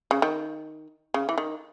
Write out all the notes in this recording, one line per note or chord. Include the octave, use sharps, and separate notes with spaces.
C#3
D#3
C#3
E3
D#3